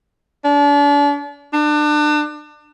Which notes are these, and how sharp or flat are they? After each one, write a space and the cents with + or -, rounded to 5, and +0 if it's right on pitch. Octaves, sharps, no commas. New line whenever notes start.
D4 -35
D4 +30